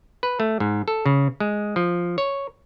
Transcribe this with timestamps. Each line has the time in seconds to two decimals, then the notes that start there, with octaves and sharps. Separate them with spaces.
0.23 B4
0.40 A3
0.60 G#2
0.88 A4
1.06 C#3
1.40 G#3
1.76 F3
2.18 C#5